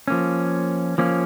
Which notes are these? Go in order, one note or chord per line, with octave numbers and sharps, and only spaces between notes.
F3 A#3 C#4
F3 A#3 C#4